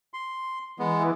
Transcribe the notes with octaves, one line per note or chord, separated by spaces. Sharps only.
C6
E3 G#3 B3